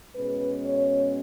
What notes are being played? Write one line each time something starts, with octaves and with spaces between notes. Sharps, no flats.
B2 G#3 C#4 B4
C#5